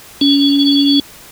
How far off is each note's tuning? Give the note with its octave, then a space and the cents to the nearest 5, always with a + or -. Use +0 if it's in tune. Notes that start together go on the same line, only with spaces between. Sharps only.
C#4 +30